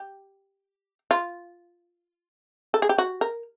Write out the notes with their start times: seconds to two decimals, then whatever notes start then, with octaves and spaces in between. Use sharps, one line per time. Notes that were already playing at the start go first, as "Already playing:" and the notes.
Already playing: G4
1.11 F4
2.74 A4
2.82 G#4
2.89 G4
2.98 F#4
3.21 A#4